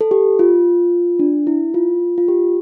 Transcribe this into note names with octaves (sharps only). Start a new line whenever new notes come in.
A4
G4
F4
D4
E4
F4
F4
G4